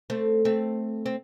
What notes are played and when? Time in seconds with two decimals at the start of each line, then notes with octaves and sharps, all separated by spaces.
0.10 A3 C4
0.45 A3 C4
1.06 C4